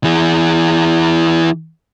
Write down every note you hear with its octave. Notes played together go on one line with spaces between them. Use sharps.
E3 G#4